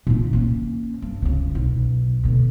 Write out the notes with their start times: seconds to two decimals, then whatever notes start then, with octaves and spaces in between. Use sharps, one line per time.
0.07 A#2 D#4
0.33 A#3 C#4
1.02 G2
1.22 C#2 C#3
1.55 B1
2.24 D2 B2